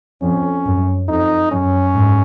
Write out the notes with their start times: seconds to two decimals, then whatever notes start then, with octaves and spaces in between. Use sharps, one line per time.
0.22 F2 C#4
0.65 F#2
1.08 F2 D#4
1.51 F#2 C#4
1.94 G#2